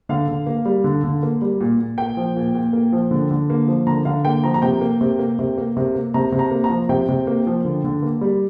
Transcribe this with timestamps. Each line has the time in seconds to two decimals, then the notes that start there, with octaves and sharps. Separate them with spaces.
0.09 D3 F5
0.28 D3
0.47 A#3
0.65 G3
0.84 D3
1.04 D3
1.23 A#3
1.42 G3
1.60 A#2
1.80 A#2
1.98 A#3 G5
2.17 F3
2.36 A#2
2.54 A#2
2.73 A#3
2.93 F3
3.11 D3
3.31 D3
3.50 A#3
3.68 F3
3.87 D3 A#5
4.05 D3 F5
4.25 A#3 G5
4.44 F3 A#5
4.54 A#5
4.62 C3 G5
4.81 A#3
5.01 C3
5.19 A#3
5.39 C3
5.58 A#3
5.77 C3
5.94 A#3
6.14 C3 A#5
6.32 C3
6.39 A#5
6.51 A#3
6.64 A#5
6.70 F3
6.89 C3 G5
7.09 C3
7.27 A#3
7.47 F3
7.65 D3
7.84 D3
8.02 A#3
8.21 G3